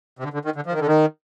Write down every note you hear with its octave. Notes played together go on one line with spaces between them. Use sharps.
C3
D3
D3
D#3
D3
F3
D#3
D3
D#3